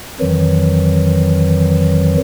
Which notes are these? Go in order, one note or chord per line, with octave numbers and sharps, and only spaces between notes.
F2 D#3 E3 F#3